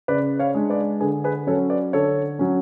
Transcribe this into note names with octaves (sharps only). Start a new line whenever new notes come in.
C#3 B4 D5
C#5 F5
G#3 D4
B4 D5
D3 G#4 B4
G#4 B4
F#3 C#4 A4 C#5
B4 D5
D3 A4 C#5
F#3 C#4